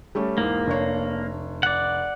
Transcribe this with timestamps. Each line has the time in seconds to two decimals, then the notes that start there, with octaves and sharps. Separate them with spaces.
0.15 G3 A3 C#4
0.38 E2 G#2 A#3
0.67 F1 D4 C#5
1.63 D5 F#5